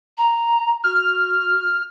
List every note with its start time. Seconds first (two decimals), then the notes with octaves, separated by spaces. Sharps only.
0.18 A#5
0.84 F#4 F6